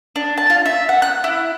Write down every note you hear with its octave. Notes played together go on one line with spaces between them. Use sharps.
D4
A5
F4
E5
F#5
F#6
E4